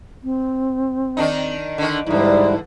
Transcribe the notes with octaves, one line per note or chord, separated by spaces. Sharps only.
C4
D#3 D4 D#4
D3 D#3 D4
E2 G#2 D3 G3 D#4 E4